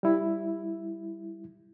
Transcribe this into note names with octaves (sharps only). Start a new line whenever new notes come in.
G3 E4